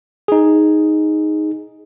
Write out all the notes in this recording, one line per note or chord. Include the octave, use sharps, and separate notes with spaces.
D#4 G#4